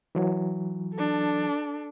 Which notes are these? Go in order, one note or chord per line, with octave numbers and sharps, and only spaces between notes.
E3 F#3
D4 A4